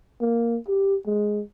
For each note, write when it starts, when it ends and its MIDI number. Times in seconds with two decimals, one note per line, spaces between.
0.21 0.57 58
0.68 0.96 67
1.06 1.41 56